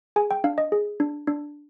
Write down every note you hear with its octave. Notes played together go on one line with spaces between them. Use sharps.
G#4 G#5
G5
D4 F5
D#5
G#4
D4
D4